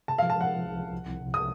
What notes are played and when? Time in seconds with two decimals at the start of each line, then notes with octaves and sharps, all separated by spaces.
0.08 C3 A5
0.18 F3 F5
0.30 A5
0.37 F3 F#5
0.50 F3
0.65 C2
0.79 F3
0.93 C2
1.06 C2
1.20 C3
1.34 D#6